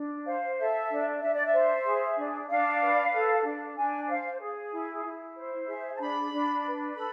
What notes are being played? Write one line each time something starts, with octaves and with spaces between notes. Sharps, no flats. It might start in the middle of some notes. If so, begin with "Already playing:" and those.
Already playing: D4
C5 F5
A4 E5
D4
D4 E5
D5
E5
C5
G#4
D4
D4 F5
B4
A4
D4
D4 G#5
C5 F5
G#4
E4
E4
C5
G#4 E5
A5
D4 B5
D4
B4
A4 B5